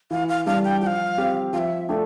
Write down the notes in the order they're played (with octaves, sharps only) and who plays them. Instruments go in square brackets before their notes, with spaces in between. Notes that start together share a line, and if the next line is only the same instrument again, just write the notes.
[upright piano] E3 [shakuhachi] F5
[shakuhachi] F5
[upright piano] G3 D4 [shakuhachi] F5
[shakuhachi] G5
[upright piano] F3 [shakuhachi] F5 G5
[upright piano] C4 G4
[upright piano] F3 [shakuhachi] E5 F5
[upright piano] A3 D4 [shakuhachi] G5